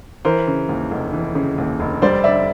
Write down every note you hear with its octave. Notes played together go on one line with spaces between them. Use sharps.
E3 A#4 C5
C#3
D#2
F1
E3
C#3
D#2
F1
G3 C5 D5
D3 D5 E5